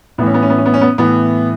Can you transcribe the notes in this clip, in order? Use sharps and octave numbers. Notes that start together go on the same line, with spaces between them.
A2 E3 B3 C#4
B3
C#4
B3
C#4
B3
C#4
B3
A2 E3 B3